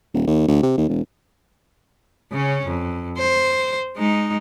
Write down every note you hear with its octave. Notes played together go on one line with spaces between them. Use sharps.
D#1
D#2
D2
C3
D#2
E1
C#3 C#4
F2
C5
G#3 D#4